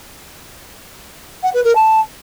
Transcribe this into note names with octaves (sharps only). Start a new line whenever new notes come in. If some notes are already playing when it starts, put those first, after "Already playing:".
F#5
B4
A#4
A5